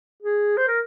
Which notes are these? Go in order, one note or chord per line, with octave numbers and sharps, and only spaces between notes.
G#4
C5
A#4